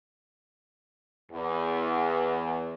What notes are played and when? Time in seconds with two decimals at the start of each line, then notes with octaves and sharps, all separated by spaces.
1.32 E2